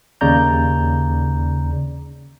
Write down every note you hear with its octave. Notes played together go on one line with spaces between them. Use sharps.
D#2 C#3 D5 A#5 G6